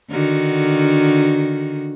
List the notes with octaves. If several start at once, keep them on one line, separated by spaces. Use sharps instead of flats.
D3 D#3 F#4